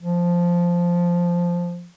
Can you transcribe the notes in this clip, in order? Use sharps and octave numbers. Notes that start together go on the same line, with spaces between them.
F3